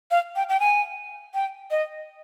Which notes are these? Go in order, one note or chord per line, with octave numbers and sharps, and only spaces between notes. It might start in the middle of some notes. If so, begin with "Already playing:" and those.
F5
G5
G5
G#5
G5
D#5